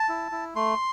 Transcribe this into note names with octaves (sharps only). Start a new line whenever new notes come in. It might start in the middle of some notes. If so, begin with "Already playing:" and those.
Already playing: A5
E4
E4
A3 C6